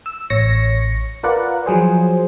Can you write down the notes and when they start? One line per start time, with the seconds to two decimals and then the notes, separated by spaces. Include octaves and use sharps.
0.06 E6
0.30 A1 C#5 A#6 C#7
1.23 F4 A#4 B4 D5 F#5
1.66 F3 F#3 G#4 C5